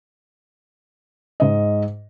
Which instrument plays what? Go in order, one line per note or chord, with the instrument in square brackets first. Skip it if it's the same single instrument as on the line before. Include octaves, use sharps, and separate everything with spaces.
[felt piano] G#2 D#5